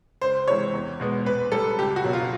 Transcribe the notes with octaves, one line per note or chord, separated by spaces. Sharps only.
C#2 C5
C3 E3 G#3 C#5
E2
B2 G#3 B3
A#2 B4
G3 A#3 A4
C#2 G4
F#4
B2 F#3 A#3
F4